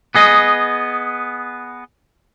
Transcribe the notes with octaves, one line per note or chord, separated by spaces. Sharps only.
B3 G#4 D#5